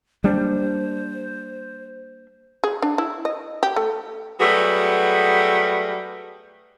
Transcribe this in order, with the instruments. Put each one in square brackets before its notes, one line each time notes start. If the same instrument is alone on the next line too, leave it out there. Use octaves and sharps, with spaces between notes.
[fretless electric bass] G3 A#3 D4 [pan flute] C5
[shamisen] G#4
D4
E4
D#5
G4
A3
[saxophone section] F#3 G3 A3 B3 G#4